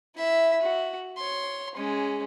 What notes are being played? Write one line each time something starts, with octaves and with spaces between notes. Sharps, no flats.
E4 E5
F#4
C#5 C6
G#3 C#4